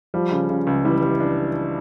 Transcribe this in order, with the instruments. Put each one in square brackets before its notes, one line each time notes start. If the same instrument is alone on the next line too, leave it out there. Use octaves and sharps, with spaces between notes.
[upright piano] F3 [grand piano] G3
[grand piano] C#3
C#3
C#2
[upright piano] E3 [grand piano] G3
[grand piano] G3
D4